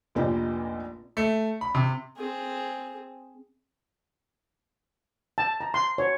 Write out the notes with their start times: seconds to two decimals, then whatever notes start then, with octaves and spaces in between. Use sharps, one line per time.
0.15 F1 A#1 A#2 A#3 G4 D#5
1.17 A3
1.61 B5
1.75 C3
2.17 C4 G#4
5.38 A5
5.61 A#5
5.74 C6
5.98 C#5